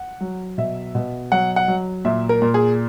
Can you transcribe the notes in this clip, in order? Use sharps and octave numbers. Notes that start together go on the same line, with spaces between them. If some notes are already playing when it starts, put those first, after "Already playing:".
Already playing: F#5
F#3
B2 E5
B2
F#3 F#5
F#5
F#3
A#2 E5
A#4
A#2
G#4